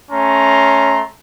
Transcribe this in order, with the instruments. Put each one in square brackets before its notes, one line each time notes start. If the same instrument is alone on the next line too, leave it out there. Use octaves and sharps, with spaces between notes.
[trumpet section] A3 C#4 A#5 C6